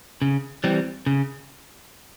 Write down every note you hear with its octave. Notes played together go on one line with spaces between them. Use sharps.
C#3
E3 G3 C4
C#3